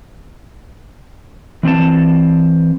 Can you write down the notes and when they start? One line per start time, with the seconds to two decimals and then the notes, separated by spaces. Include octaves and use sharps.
1.63 E3 C4 D#5 A5